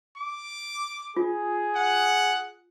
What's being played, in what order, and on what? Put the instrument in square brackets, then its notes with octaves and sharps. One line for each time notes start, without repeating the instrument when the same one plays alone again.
[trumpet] D6
[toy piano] F4 [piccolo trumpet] G#4
[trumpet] F#5